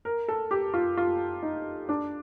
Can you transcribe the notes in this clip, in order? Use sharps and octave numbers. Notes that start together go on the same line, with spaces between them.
A#4
A4
G4
F4
F4
D#4
D4